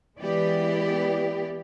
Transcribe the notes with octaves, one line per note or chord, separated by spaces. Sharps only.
E3 G#3 B3 G4 D5